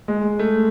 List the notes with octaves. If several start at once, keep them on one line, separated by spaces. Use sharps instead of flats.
G#3
A3